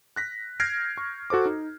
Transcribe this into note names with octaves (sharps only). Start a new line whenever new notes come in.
F#6 A#6 B6
F6 G6 G#6 A#6 C7 D7
C#6
F#4 A4 C5 D6
D#4